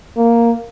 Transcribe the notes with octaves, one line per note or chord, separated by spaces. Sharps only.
A#3